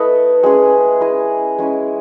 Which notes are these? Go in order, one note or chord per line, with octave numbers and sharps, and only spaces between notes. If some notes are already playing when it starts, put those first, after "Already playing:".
Already playing: A3 E4 A4 B4 D#5
G#3 C#4 G#4
E4 G#4 D#5
G#3 C#4 E4